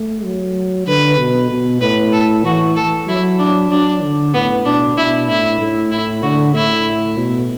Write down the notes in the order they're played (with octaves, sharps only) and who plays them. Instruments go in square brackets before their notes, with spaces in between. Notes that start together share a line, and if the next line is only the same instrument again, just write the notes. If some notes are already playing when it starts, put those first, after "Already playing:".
Already playing: [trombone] A3
F#3
[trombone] D3 [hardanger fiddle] B4
[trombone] B2
B2
[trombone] A2 [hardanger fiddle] B4
[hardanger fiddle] A4
[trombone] E3 [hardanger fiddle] F#4
[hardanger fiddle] A4
[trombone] F#3 [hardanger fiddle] E4
[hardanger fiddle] D4
[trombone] F#3 [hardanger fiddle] D4
[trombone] D3
[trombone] A2 [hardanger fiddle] B3
[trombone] B2 [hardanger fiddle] D4
[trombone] B2 [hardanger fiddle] E4
[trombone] A2 [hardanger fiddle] E4
[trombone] A2
[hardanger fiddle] E4
[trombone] D3 [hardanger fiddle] F#4
[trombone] A2 [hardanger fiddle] E4
[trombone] B2